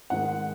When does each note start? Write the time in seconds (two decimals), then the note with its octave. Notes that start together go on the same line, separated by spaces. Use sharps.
0.10 G#2 D#3 G#3 F#5